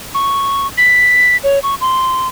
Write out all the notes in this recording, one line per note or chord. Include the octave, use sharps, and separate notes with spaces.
C#6
B6
C#5
C#6
C6